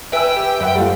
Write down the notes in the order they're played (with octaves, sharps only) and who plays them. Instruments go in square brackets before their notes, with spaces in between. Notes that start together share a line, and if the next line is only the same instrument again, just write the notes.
[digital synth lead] B4 [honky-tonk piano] E5 G#5 E6 [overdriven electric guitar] G5
[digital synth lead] G4
[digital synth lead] F#2 [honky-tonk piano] B4 E5 F#5
[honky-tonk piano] G3 A3 F4